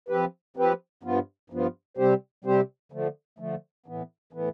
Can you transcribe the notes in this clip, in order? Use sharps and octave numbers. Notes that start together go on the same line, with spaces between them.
F3 C4 G4 B4
F3 C4 G4 B4
G2 F3 B3 F4
G2 F3 B3 F4
C3 G3 C4 G4 C5
C3 G3 C4 G4 C5
D3 F3 A3
D3 F3 A3
A2 E3 B3
A2 E3 B3